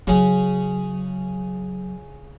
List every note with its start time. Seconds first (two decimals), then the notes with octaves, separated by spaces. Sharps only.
0.07 C#3 F#3 C#4 G#4